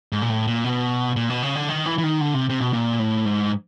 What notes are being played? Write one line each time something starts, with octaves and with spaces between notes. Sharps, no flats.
G#2
A#2
A2
A#2
B2
A#2
B2
C#3
D3
D#3
E3
E3
D#3
D3
C3
C3
B2
A#2
A2
G#2